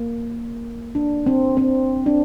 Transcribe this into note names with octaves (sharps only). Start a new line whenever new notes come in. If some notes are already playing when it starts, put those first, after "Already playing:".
Already playing: A#3
D4
C4
C4
D4